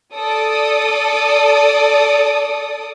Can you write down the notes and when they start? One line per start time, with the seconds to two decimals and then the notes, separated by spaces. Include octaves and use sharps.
0.14 A4 D5 D#6